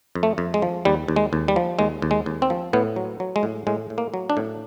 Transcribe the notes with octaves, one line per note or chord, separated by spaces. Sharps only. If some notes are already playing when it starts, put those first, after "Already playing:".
F2
A3
F2
G#3
F3
D#2 G3
D#2
G#3
D#2
G3
F3
D#2 G#3
D#2
G#3
D#2
C4
F3
A2 B3
F#3
F#3
G#3
A2
A2 G#3
A2
A#3
F#3
D4
A2